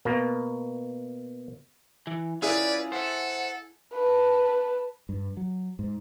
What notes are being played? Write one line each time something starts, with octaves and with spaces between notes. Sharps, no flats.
B2 A#3
E3
C#4 E4 F4 G#4 B4 D5
A4 C5 E5 F#5
B4 A5
G2
F#3
G#2